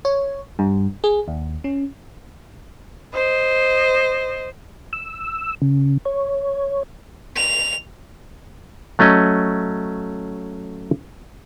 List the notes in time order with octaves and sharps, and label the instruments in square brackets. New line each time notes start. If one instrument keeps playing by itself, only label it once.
[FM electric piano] C#5
G2
G#4
D#2
C#4
[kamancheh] C5 D#5
[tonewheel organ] E6
C#3
C#5
[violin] F7
[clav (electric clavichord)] F#3 A3 C#4 D#5